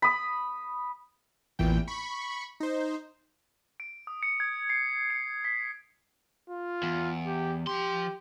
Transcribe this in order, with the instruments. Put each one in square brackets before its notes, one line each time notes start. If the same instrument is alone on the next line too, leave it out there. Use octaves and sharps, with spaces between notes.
[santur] B5 D#6
[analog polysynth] A1 E2 A#2 E3 G5
B5 C#6
D#4 C5
[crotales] D7
D#6
C#7
G#6
C7
C#7
B6
[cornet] F4
[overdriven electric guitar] E2
[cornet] G4
[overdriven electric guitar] F3 C6 [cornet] G4